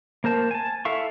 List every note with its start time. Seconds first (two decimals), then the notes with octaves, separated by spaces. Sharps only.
0.24 A#3 A#4 C5 A5
0.51 G#5 A5
0.85 E4 A4 E5 F5 C#6